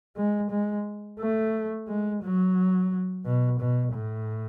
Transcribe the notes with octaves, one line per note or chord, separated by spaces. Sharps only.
G#3
G#3
A3
G#3
F#3
B2
B2
A2